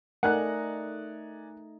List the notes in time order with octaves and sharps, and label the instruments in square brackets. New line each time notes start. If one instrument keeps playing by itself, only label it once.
[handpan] A3 D#4 [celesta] A#4 [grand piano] D5 G#5 A#5 [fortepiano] F#5 F#6